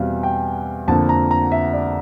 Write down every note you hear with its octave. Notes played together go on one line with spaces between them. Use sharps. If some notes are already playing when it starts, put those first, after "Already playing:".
Already playing: E2 B2 G3 C4 F5
G5
F2 D3 F3 A#3 A5
A#5
A#5
E5
D5